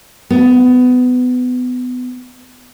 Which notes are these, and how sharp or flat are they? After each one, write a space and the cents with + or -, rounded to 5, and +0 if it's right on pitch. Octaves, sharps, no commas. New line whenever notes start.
B3 +25